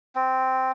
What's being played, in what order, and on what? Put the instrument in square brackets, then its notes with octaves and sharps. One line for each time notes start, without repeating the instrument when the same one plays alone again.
[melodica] C4